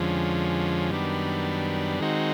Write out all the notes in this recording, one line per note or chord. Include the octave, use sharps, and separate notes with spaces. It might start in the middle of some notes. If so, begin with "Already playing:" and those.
Already playing: F2 D3 F3 G#3 C#4
F#2 D#3 G3 B3 D4
D#3 G#3 C4 D#4 F#4